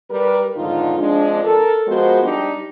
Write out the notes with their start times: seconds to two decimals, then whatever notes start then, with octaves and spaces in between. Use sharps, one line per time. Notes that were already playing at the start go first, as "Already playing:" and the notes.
0.10 G3 A#4 B4
0.56 F2 G#2 D3 D#3 D#4 F4
0.98 F3 G#3 C4 D4
1.44 A4 A#4
1.87 F3 G#3 B3 F#4 A#4 C5
2.23 G3 D4 D#4 G4